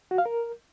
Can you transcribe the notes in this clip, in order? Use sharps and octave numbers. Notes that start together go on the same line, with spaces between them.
F#4
F5
A#4